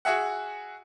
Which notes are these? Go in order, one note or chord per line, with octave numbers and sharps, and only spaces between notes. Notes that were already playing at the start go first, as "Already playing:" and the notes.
F#4 G#4 E5 F#5